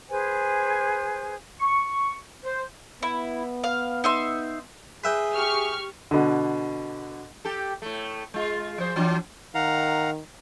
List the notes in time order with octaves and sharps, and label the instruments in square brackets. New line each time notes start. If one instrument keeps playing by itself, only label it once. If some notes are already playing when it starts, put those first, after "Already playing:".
[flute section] G#4 B4 C5 G#5
[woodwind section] C#6
C5
[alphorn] B3 [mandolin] E4
[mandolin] F5
D#4 E5 C6
[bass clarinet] G#4 [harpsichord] B4 E5 G5
[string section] G4 C#6 F6
[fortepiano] B2 D3
[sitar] G4 A4
A2 A3
G#3 F4
F3 G#4 C5
E3 F#3 D4
[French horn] D#3 [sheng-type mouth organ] F5 F#5 A#5